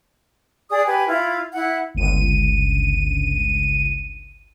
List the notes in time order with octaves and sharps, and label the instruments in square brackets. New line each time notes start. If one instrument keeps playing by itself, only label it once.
[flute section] G#4 D5 D#6
G4 B4 G#5
E4 F4
E4 F#5
[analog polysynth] G1 C#2 D#7